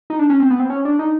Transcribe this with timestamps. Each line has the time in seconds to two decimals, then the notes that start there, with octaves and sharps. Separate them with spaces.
0.10 D#4
0.19 D4
0.30 C#4
0.40 C4
0.50 B3
0.60 C4
0.70 C#4
0.85 D4
0.99 D#4